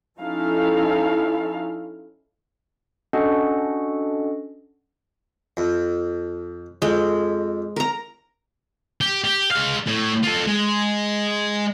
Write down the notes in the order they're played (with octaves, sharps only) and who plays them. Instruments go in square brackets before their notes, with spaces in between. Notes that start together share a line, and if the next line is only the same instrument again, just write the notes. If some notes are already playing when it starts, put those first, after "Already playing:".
[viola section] F3 C#4 D#4 E4 A4 F5
[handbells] C#4 D4 F#4 A4 D#5 F#5
[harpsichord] F2
[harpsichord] F2 [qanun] G#3
[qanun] A#4 A#5
[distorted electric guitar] G4
G4
G#3 F5
A2
F4 A4
G#3